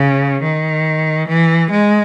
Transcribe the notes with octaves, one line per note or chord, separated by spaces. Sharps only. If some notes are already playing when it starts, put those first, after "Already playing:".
Already playing: C#3
D#3
E3
G#3